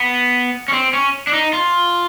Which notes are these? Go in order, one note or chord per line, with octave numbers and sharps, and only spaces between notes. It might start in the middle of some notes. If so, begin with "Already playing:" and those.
Already playing: B3
C#4
C4
C#4
D4
D#4
F4